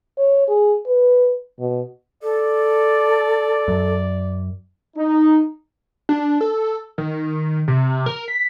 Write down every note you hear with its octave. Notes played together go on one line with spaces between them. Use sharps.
C#5
G#4
B4
B2
A4 D5
F#2
D#4
D4
A4
D#3
C3
A#4
B6